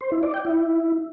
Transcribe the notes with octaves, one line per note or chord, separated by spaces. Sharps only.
C5
E4
D5
G5
E4